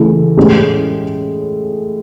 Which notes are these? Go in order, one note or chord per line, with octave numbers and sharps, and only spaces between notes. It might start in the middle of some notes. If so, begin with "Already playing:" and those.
Already playing: C#3 E3 A3
A2 G#3 C#4